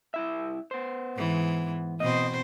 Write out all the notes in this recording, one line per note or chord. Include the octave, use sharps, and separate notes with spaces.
C2 E4 E5
B3 C5
G#2 E3
B2 C4 C5 D#5